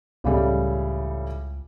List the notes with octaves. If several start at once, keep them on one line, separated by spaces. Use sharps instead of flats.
C#2 A2 C#3 G3